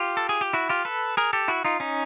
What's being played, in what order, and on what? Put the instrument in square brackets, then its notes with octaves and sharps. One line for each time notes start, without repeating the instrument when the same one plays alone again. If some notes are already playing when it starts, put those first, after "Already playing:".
Already playing: [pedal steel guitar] F4 G4
A4
G#4
G4
E4 F#4
F4 G4
A4 B4
G#4 A#4
G4 A4
E4 F#4
D#4 F4
C#4 D#4